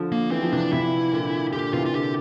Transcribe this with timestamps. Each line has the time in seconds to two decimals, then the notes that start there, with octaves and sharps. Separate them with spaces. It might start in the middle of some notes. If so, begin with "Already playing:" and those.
Already playing: D3 F3
0.12 A#3
0.31 E3 C4
0.42 F3
0.52 C3 E3 D4
0.72 C3 E3 E4
1.12 A#2 D3
1.53 A#2 D3 G4
1.73 C3 E3 F4
1.86 F4
1.94 A#2 D3 G4